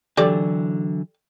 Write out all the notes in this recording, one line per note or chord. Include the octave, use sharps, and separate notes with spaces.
D3 E3 F#3 G4 A4 D5